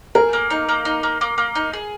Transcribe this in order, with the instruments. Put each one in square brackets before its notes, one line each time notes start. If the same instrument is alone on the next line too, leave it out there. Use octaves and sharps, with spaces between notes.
[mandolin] G#4 [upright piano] A#4
[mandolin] A#3
D#4
A#3
D#4
A#3
A#3
A#3
D#4
G#4